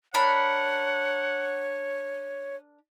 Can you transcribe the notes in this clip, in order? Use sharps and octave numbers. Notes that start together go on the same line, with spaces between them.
D4 A#4 C#5 F#5 B5